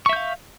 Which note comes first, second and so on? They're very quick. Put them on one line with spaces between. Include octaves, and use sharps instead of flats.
C#6 E5 G6 F5